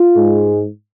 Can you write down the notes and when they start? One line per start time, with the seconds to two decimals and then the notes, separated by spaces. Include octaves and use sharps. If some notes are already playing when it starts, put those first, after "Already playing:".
Already playing: F4
0.14 G#2 G#3